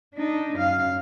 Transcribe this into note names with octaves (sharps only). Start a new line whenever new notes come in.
D4 D#4
F#2 F5